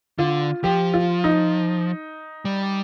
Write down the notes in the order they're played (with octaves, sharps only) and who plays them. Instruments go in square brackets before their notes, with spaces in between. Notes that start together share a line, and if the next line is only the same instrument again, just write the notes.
[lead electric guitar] D3 [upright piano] F4
[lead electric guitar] F3 [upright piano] G4
[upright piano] F4
D#4
[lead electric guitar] G3